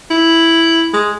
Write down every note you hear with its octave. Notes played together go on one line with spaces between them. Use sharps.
E4
G#3